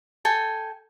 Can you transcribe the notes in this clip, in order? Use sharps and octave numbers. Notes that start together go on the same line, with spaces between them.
A4 G5 G#5